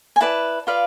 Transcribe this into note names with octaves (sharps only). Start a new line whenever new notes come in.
G#5
E4 B4 D5 A5
F4 B4 D5 F5